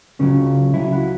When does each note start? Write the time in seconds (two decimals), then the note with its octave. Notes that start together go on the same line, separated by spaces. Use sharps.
0.19 C#2 C#3 F#3 C#4
0.74 C#2 C#3 F#3 E4
0.93 F#4